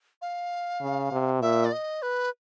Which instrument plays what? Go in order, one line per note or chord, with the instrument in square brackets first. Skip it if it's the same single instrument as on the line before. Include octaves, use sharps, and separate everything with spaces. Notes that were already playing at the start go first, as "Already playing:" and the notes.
[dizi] F5
[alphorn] C#3
C3
[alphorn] A#2 [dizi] E5
[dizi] D5
D#5
B4